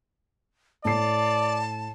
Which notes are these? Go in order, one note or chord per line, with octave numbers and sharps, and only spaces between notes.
A2 D5 A5 C7